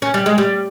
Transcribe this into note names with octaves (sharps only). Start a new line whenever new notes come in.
C#4
G3
G#3
G3